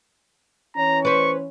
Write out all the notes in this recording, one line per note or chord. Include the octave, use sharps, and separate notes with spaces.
E3 C#4 C#5 A#5
B4 C5 C#6